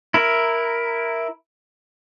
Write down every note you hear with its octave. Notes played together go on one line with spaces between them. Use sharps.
E4 A#4